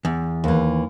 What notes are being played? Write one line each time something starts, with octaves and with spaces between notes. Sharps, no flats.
E2
D#2 E3